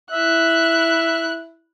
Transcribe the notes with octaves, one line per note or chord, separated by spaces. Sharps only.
E4 E5 F#6